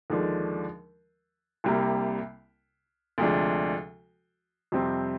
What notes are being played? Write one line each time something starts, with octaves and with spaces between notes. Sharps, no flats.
D#2 D3 F3 G#3 D4
C2 C3 G3 A#3
D2 C3 F3 G#3 D4
F2 C3 G3 C4